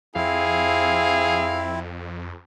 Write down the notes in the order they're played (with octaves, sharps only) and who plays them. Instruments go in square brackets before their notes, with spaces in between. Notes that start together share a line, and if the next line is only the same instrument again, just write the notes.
[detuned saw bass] F2 [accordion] C4 E4 [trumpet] G#4 [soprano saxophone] F5